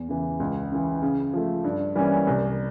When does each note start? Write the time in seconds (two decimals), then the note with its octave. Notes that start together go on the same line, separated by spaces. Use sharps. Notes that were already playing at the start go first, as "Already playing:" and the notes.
Already playing: E2
0.09 C#3 E3
0.40 C#2
0.71 C#3 E3
1.02 C#3
1.34 F3 A3
1.64 G2
1.95 E3 G3 A#3 C#4
2.27 C2